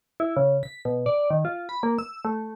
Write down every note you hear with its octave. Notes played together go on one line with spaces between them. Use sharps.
E4
C#3
B6
B2
D5
D#3
F4
B5
A#3
E6
A3